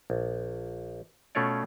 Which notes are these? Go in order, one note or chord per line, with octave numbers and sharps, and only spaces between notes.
A#1
B2 A3 C#4 F4 C#5 D5